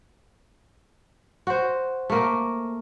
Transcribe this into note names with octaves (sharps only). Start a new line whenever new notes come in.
F#4 C5
A3 A#3